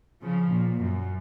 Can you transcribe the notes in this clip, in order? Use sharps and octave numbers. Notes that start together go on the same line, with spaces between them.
C#3 F3
A#2
F#2